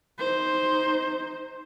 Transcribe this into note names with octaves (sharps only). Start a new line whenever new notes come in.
D#4 C5